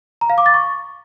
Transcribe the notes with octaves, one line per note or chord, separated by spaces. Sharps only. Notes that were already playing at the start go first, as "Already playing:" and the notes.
A#5
F5
D6
A6
C#6